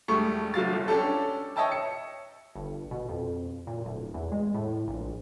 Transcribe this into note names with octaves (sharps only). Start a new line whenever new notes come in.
E1 G3 A3 C#6
F#1 F#3 F5 A6
G1
C#4 D4 G4 A4
C#5 D#5 E5 G5 A5 E6
C#7
G1
B2
F2
A#2
D1
E2
G#3
A2
A#1